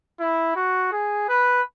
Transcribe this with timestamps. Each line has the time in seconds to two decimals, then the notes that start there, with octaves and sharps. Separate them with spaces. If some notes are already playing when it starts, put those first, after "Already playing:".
0.20 E4
0.56 F#4
0.92 G#4
1.29 B4